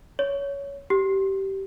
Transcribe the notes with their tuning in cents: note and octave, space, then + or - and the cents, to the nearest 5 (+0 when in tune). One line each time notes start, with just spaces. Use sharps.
C#5 +15
G4 -20